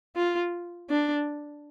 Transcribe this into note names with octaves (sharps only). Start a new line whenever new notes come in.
F4
D4